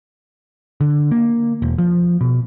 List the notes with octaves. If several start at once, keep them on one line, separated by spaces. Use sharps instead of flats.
D3
A#3
E1
F3
B2